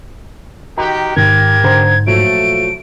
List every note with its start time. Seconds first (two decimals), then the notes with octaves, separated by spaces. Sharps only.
0.78 D#3 F#4 G4 A#5
1.16 G#2 D#3 G4 A#4 G#6
1.64 D3 C5 A#5
2.07 A#2 F3 F#3 A3 D7